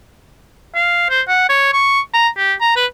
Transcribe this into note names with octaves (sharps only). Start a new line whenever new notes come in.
F5
C5
F#5
C#5
C#6
A#5
G4
A#5
B4